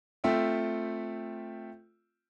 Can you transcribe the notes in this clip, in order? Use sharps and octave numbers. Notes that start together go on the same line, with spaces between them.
A3 C4 F4 E5 G5